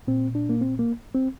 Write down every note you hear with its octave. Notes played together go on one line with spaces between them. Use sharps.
A#2 C4
D4
A#3
C4
A#3
C4